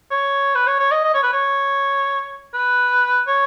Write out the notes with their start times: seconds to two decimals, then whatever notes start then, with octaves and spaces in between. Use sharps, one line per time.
0.11 C#5
0.55 B4
0.67 C#5
0.79 C#5
0.92 D#5
1.04 D#5
1.14 C#5
1.23 B4
1.33 C#5
2.54 B4
3.28 C#5